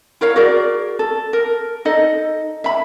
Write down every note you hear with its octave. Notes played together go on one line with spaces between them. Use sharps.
E4 A#4 C#5 F5
F#4 G#4 A#4 D5
A4
A#4
D#4 A4 D#5
E5 B5